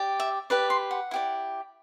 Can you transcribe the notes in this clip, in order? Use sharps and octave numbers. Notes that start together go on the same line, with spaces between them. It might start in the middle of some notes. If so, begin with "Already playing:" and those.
Already playing: G4 D5
E5
G4 B4 D5
C6
F#5
E4 G4 D5